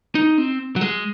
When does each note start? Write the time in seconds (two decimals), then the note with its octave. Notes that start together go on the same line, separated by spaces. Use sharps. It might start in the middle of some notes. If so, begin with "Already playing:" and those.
0.15 D#4
0.38 C4
0.76 F#3
0.81 G#3